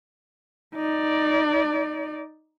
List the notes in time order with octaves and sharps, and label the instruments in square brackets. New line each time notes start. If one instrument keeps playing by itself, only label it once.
[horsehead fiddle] D#4 D5